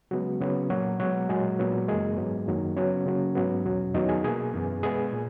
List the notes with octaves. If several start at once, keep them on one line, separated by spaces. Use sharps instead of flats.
C#3 F#3 G#3 B3 F#4
C#3 F#3 B3
A#2 F#3 A#3 F#4
B2 F#3 G#3 B3 F#4
A#2 F#3 G#3 A#3 G#4
A#2 F#3 B3
F#2 C#3 E3 G#3 A#3 G#4
G#2 F#3 B3
F#2 D#3 F#3 A#3
C#3 F#3 B3 C#4 C#5
C#3 F#3 A#3
G#2 F#3 B3
E2 B2 F#3
E2 D#3 F#3 B3 D#4 D#5
G#4 G#5
B2 A#3 G#4 G#5
F#2 E3 B3
B2 G#3 B3 G#4 G#5
A#2